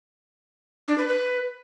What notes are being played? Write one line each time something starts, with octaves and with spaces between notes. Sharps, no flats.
D4
B4
B4